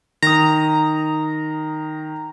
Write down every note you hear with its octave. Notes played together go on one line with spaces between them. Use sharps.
D#3 A#5 D#6